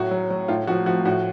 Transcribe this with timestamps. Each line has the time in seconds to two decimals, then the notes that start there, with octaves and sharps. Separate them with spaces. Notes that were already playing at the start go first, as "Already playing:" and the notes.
Already playing: A2 F#3 F#4
0.11 F#3
0.30 F#3
0.48 A2 F4
0.67 F3 F#4
0.86 F3 F#4
1.05 A2 F#4